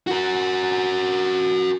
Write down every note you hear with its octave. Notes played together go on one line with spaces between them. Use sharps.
F#4 A#4